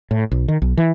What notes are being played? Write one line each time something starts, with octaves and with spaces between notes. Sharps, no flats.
A2
B1
D#3
B1
E3